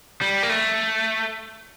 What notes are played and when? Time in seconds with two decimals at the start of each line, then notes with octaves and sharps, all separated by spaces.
0.21 G3
0.43 A#3
0.50 A3